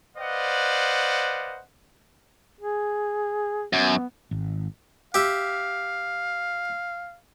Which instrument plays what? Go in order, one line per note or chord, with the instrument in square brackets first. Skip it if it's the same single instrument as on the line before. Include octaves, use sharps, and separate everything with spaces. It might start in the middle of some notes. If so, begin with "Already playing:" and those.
[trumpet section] B4 C5 D5 D#5 F5 F#5
[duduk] G#4
[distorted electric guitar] F#2 [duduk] B3
[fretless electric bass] G#1
[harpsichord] G4 E5 [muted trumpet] F5